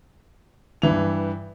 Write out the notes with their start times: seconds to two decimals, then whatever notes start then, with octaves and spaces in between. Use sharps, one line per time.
0.82 G2 E3 F7